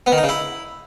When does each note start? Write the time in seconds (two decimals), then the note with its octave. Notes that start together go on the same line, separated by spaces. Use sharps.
0.06 B3
0.12 D#3
0.18 D#4
0.23 C#3
0.29 E4